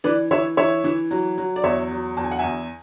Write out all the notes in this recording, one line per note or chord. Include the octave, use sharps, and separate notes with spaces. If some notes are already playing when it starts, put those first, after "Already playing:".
E3 B4 D5
E3 C#5 E5
E3 C#5 E5
E3
F#3
F#3
D5
E2 C#5 E5
F#3
E2 A5
G#5
F#5
E2 E5 G#5